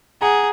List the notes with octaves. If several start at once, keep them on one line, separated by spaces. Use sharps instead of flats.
G#4 F#5 A#5